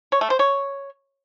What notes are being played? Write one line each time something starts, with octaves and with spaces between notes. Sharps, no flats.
C#5
A3
C5
C#5